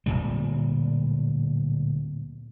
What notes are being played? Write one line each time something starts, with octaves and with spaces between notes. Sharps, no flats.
D1 C#2 A#2 G3